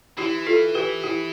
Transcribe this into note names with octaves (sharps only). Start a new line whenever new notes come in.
E3 E4 G4
F4 A4
G4 B4
E4 G4